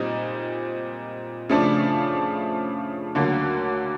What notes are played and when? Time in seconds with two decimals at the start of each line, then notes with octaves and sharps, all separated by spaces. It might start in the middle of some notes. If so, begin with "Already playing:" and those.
Already playing: A#2 G3 C4 D#4
1.49 C#3 F3 A3 D4
3.15 D2 D3 F#3 A#3